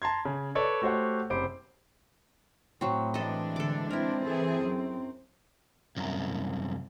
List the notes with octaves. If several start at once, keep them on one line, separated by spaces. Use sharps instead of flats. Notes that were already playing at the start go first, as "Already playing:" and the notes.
A5 A#5 C6 G#6
C#3
A4 B4 C#5 D5
A3 F#4 G4 C5 C#5 F#5
F#1 C3 C5 B5 D6 D7
A2 F#3 C4
E3 G#3 D4 A4 D#5
D3 A4 D6
C4 E4 A#4
E3 G#4 A4
F#2
C2 F#2